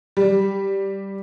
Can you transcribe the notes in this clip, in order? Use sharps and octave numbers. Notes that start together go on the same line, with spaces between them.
G3